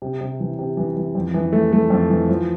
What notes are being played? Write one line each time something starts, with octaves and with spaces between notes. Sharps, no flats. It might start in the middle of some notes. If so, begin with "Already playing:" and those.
C3
C3
E3
C3
E3
E3
F2
E3
A3
A3
F2
E3
F3